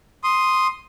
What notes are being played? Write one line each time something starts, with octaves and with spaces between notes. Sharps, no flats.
C6 D#6